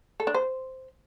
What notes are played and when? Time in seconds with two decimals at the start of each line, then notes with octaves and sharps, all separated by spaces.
0.20 A4
0.27 D4
0.34 C5